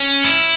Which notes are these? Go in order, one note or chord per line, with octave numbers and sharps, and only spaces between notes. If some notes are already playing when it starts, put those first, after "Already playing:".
Already playing: C#4
E4